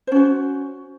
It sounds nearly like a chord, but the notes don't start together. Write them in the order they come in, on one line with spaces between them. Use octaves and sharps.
C5 C#4 F#4